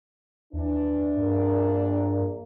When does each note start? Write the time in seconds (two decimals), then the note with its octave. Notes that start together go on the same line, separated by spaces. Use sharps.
0.53 D#2 E3 D4
1.16 A#1 G2 A#2 A#3